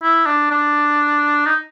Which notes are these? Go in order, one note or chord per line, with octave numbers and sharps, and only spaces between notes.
E4
D4
D4
D#4